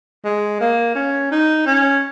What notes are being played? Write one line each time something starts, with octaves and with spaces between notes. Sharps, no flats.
G#3
A#3
C#4
D#4
C#4